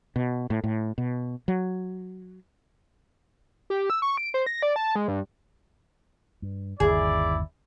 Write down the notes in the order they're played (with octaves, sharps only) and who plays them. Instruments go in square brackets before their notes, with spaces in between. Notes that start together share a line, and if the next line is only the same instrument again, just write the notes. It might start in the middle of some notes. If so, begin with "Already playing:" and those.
[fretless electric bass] B2
A2
A2
B2
F#3
[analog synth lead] G4
E6
C#6
D7
C5
A#6
D5
A5
G#3
G2
[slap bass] G2
[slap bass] G1 D#2 C#3 [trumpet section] E4 D5 [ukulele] G#4